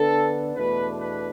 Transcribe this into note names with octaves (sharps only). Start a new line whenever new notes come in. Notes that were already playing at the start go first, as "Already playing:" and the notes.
Already playing: D3 B3 D4 A4
E2 B2 A3 D4 B4
B4